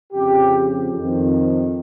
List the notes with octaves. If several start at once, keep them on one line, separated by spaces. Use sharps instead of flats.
F2 C#3 F3 G4
F2 D#3